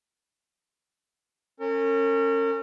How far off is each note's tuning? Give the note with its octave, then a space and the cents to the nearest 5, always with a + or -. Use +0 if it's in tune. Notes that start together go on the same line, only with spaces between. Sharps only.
C#4 -20 A#4 -40